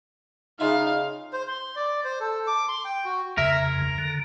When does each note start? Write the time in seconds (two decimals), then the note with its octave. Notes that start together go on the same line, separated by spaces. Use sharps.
0.60 C#3 D#4 F4 E5 F5
1.33 C5
1.47 C6
1.76 D5
2.04 C5
2.20 A4
2.47 D6
2.68 C6
2.85 G5
3.05 F#4
3.38 F2 C#3 A#4 E5
3.53 A#5
3.98 D3